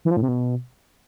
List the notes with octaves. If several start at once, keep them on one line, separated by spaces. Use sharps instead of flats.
E3
F3
A2
C3
B2